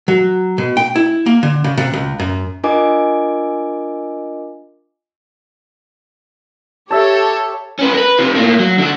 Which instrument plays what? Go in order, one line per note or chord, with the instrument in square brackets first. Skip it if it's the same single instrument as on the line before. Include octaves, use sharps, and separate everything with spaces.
[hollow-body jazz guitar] F#3
B2
G5
E4
A#3
D3
C#3
C3
C#2
F#2
[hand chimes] D4 F4 A#4 D#5 G#5 D6
[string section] G4 A4 C#5 [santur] E5 A5
[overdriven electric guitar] C#4 B4
A#4 B4
C3 F3
A2 A#3
F#3
D3 F#4